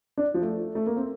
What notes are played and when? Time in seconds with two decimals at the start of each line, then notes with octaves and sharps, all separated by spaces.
0.18 D4
0.34 F3
0.42 A3
0.75 A3
0.86 A#3
0.97 C4